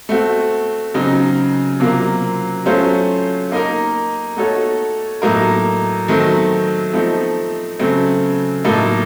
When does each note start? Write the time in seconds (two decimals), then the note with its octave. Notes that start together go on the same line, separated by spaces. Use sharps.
0.09 A3 C4 F#4
0.94 C#3 F#3 C4 D#4
1.80 C3 F#3 A#3 F4 A#4
2.66 F#3 A3 C#4 F4 C5
3.52 A#3 D#4 A#4
4.37 A3 D#4 F#4 A4 C#5
5.22 A2 F#3 A#3 D#4 A#4
6.08 D#3 F#3 A3 C4 D#4
6.93 F3 A3 C4 D#4
7.79 C#3 F#3 A3 C4
8.64 A2 F#3 A#3 D#4 A4